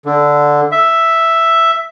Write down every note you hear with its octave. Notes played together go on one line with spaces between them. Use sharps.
D3
E5